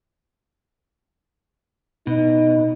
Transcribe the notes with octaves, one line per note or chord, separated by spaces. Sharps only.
B2 D#4